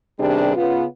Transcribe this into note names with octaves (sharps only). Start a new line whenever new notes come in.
C3 D#3 G3 B3 D4 G#4
C#3 B3 F4